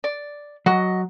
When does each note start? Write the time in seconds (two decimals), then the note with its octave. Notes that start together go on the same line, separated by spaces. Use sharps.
0.04 D5
0.66 F#3 F#4 D#5